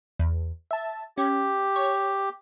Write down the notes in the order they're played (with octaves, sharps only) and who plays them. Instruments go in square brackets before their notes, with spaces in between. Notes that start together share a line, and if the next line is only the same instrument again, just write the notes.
[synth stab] E2
E5 A5
[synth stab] C#4 [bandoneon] G4
[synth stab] C#5